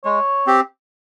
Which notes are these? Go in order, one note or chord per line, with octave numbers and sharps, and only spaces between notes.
G#3 C#5
C4 G4